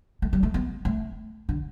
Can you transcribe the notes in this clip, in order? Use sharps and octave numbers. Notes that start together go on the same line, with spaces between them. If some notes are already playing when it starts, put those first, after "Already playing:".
A3
G3
A3
B3
A3
D3